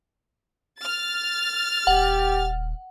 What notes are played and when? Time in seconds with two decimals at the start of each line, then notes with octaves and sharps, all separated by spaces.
0.80 F6 A6
1.87 D#1 G4 F#5